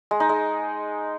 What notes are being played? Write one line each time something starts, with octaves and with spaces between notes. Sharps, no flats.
G#3
D#4
G#3